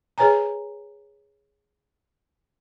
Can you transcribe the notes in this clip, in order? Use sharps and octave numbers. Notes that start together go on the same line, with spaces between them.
G#4 B4 C#5 G#5 A#5